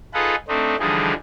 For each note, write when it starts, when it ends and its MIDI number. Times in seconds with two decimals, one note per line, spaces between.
0.14 0.35 63
0.14 0.35 65
0.14 0.35 68
0.14 0.35 69
0.14 0.35 71
0.14 0.35 78
0.48 0.76 57
0.48 0.76 60
0.48 0.76 62
0.48 0.76 63
0.79 1.13 50
0.79 1.13 52
0.79 1.13 53
0.79 1.13 55
0.79 1.13 63
0.79 1.13 68